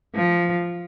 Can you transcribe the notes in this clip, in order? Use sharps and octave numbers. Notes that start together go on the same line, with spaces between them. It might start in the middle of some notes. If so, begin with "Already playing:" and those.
F3